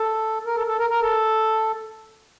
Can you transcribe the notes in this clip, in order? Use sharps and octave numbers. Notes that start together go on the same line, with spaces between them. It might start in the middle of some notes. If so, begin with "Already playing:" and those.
Already playing: A4
A#4
A4
A4
A#4
A#4
A4